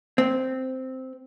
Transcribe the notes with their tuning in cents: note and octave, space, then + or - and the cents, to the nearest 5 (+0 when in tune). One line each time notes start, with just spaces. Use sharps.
C4 -5